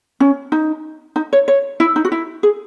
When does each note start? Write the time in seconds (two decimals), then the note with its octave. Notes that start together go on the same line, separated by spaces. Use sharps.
0.20 C#4
0.52 D#4
1.16 D#4
1.33 C#5
1.48 C#5
1.80 E4
1.96 D#4
2.05 F#4
2.12 E4
2.43 G#4